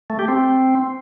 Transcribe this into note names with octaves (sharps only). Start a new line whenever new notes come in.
A3
G4
C4